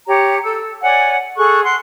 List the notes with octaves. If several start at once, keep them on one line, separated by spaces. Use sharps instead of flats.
G4 C#5 A#5
A4 E6
C#5 D5 F#5 G#5
G#4 A4 C#6 F#6
F#5 C6 F#6